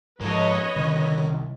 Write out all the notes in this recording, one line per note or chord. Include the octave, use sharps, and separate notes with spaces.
G#2 F3 A#3 A4 B4 C#5 D#5
C2 D3 D#3 C#4